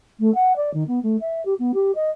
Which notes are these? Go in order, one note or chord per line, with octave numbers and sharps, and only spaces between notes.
A3
F#5
D5
D#3
B3
A3
E5
G4
B3
G4
D#5